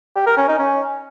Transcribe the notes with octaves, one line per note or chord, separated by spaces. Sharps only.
G4
A#4
C#4
D#4
C#4